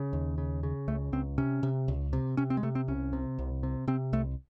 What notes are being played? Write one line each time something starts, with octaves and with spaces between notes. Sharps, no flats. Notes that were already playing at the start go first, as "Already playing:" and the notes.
Already playing: C#3
D#2
C#3
C#3
C#2 A3
C#2 C4
C3 C#4
C3
C#2
C3
C3 C#4
C4
G#3
C3 A3
C4
C2 C#4
C3
C2
C3
C3 C4
C2 A3